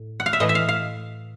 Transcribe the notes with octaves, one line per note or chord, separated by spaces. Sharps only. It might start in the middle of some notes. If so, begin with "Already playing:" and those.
Already playing: A2
F#5
F5
E5
A2 E3 A3 D#5
E5
F5
F5